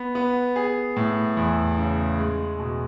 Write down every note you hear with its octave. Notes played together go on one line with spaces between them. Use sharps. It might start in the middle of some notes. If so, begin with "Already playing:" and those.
Already playing: B3
B3
G#4
A2
E2
C#3
G#3
B2